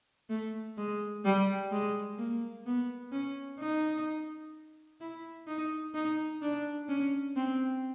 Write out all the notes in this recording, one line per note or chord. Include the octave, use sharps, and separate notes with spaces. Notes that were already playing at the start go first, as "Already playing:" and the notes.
A3
G#3
G3
G#3
A#3
B3
C#4
D#4
E4
D#4
D#4
D4
C#4
C4